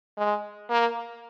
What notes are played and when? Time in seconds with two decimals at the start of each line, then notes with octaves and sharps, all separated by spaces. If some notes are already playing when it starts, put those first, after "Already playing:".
0.18 G#3
0.70 A#3